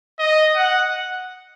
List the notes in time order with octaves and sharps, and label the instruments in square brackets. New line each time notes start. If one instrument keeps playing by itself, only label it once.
[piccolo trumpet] D#5
F#5